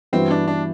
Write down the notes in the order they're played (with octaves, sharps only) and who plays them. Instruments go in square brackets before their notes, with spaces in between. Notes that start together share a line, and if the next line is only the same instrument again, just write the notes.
[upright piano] G2 E3 B3 F#4 [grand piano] C4
[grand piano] D4
D4